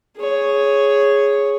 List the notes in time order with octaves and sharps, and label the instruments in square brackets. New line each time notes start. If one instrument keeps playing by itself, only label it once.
[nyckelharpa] G#4 C#5